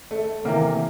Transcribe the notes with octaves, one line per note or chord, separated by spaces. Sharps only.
A3
C3 E3 A#3